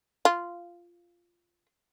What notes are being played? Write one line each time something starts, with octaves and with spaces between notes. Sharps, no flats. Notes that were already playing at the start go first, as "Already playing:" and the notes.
F4